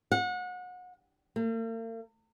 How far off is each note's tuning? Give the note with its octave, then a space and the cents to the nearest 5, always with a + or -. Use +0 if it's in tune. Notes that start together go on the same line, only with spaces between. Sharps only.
F#5 -30
A#3 -45